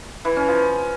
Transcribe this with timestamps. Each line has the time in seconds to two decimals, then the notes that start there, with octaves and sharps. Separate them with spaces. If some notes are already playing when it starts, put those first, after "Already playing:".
0.25 E3
0.37 C#4
0.48 F3